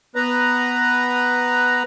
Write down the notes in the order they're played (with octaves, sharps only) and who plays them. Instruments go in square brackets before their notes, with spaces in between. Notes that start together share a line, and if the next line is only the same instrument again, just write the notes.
[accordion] B3 B4 A#5